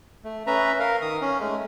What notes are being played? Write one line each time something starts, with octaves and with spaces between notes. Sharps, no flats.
A3
C#4 B4 E5 A#5
A#4 F5
D#3 D#6
C#4
G#3 A3